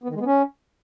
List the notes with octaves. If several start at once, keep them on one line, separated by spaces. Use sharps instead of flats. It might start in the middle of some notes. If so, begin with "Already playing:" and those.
B3
D#3
G#3
B3
C#4